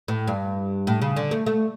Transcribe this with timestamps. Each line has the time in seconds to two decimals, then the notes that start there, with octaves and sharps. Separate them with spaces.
0.08 A2
0.28 G2
0.87 A2
1.02 C#3
1.16 D3
1.31 A3
1.46 A3